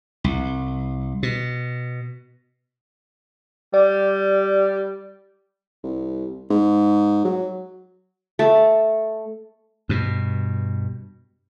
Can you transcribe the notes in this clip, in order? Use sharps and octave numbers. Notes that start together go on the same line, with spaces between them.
C2
B2
G3 D5
C2
G#2
F#3
A3
G2 B2